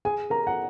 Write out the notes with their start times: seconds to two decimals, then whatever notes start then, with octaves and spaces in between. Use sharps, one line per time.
0.05 G#4 G#5
0.30 A#4 A#5
0.47 F#5